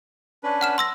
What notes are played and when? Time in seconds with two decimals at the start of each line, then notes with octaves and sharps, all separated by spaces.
0.43 C#4 D4 B4
0.61 F#5 F6 E7
0.78 C6 E6 A#6